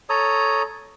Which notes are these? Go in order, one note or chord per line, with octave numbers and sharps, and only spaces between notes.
A4 C#5 A#5 D#6